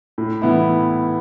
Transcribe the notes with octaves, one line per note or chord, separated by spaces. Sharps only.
A2
E3 B3 E4